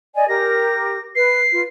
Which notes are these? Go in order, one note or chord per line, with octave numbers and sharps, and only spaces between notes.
D5 D#5 G#5
G4 A#4 A#6
B4 C7
F4 B4